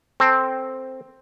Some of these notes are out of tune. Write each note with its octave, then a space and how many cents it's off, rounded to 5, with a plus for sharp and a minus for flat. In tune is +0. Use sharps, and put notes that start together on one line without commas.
C4 +0 A4 +0